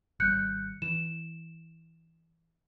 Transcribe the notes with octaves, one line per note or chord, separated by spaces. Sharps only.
G#1 G3 F#6 G6 C#7
E3 E7